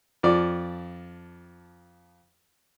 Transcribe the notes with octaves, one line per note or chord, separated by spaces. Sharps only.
F2 F3 D5